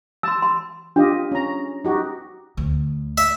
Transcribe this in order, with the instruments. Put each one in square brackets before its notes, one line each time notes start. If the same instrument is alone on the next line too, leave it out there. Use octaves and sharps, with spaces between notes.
[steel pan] A5 [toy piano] C6 E6
[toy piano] C6
[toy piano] D4 [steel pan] F4 G4 D#5
[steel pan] C#4 A#5
D#4 F#4 G4
[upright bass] D2 D3
[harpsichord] E5